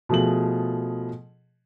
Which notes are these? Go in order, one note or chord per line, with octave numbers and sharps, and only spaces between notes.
B2 F3 A3 G#4 F#7